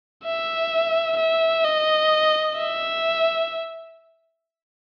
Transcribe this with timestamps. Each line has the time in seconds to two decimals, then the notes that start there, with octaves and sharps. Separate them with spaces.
0.24 E5
1.17 E5
1.64 D#5
2.57 E5